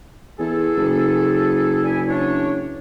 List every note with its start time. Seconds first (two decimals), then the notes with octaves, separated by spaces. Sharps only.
0.39 E2 G#4 A4
0.77 F#1
1.84 D4 E4 G#5
2.08 E2 D4 C#5